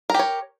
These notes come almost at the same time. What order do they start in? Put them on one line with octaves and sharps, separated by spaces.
A#4 G4 C#5